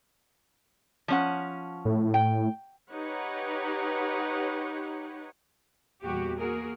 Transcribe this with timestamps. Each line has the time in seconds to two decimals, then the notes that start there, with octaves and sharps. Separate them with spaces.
1.08 F3 C#4 F#5
1.85 A2
2.14 G5
2.92 D#4 G4 B4 C#5 F#5
6.02 E2 A#2 G3 F#4 G4
6.39 A#3 F#4 G#4 A#4